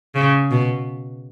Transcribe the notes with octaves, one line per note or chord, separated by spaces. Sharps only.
C#3
B2